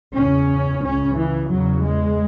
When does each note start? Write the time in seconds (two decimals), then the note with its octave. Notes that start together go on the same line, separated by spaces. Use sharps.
0.16 E2 C#3 C#4
0.82 C#2 C#3 C#4
1.16 E3
1.50 E2 C#3 F#3
1.82 G#3